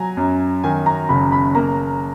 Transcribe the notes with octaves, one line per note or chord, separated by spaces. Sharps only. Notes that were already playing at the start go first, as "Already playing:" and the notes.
Already playing: F#3 G#5 A#5
F#2
D#3 G#5
A#5
F#1 B5
B5
A#3 A#5